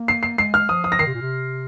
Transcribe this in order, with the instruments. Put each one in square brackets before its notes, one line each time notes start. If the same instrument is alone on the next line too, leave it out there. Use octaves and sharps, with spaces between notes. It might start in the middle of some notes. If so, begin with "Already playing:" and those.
Already playing: [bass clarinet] A#3
[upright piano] C7
C7
[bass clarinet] G#3 [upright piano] C7
[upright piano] F6
[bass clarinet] F3 [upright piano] D#6
[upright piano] D#6
A#6
[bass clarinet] D#3 [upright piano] C7
[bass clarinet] C3
A#2
C3